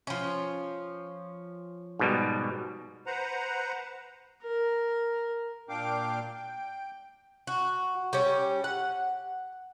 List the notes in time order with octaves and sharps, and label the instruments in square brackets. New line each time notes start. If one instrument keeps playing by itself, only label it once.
[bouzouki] F3 C#4
[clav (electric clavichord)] G#2 B2 G3
[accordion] B4 C5 F#5 A#5
[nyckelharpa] A#4
[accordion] A#2 D4 F5 G5 D6
G5
[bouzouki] F#4
G3 C#4
F#5